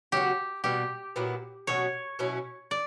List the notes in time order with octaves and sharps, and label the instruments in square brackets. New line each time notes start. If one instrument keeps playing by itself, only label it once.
[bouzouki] C#3 F#3 B3 F#4 [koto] G4
[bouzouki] B2 G3 B3 [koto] G4
[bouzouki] A#2 F#3 B3 E4
[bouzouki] B2 F#3 C#4 F#4 [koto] C#5
[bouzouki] B2 F#3 C#4 E4
[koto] D5